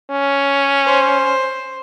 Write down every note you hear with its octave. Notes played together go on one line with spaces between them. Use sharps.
C#4
C5